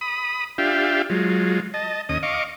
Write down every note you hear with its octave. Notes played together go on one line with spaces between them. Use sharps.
B5 D#6
D4 F4 G4 E5 F5 G5
F#3 G#3 F4
D#5 A5
D#2 C#4 D#5 D#6
D#5 F5 C#6 D6